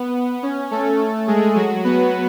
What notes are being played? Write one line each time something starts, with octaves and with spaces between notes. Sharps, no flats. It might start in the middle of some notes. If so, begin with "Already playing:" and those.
Already playing: B3
C#4
A3 A4
G#3 G#4
F#3 F#4
B3 B4